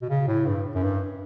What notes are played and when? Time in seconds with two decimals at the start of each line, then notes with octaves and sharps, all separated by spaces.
0.02 B2
0.09 C#3
0.27 A2
0.46 G2
0.75 F#2
0.83 G2